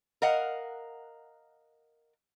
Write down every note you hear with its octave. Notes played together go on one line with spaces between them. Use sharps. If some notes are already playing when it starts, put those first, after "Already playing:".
A#4 D#5 F5 F#5